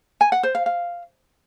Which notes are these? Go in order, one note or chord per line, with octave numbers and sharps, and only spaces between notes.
G#5
F#5
C5
F5
F5